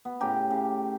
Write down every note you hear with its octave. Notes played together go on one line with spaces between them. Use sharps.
B3
A2 C#3 G4 A#5
C#3